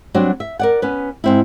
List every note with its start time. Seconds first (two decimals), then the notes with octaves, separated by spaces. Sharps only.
0.15 F#3 G3 C4 D4 F#4
0.40 E5
0.59 A#4 D5 F#5
0.82 B3 C#4 B4
1.24 G#2 C4 E4